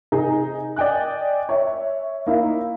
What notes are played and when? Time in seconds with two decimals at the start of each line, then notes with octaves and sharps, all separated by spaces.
0.12 C3 D#4 G#4
0.76 D5 D#5 G5 G#5 F#6
1.49 C#5 E5
2.26 A#3 D#4 E4